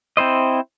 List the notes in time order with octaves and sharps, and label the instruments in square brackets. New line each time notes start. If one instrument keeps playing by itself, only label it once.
[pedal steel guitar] C4 E4 C5 D#5